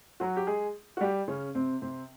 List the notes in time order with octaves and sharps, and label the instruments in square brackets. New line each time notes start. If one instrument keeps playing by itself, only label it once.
[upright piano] F#3 F#4
G4
G#3 G#4
F#4
G3 G4
C#3 C#4
C3 C4
C3 C4